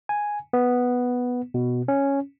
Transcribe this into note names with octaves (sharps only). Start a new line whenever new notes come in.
G#5
B3
B2
C#4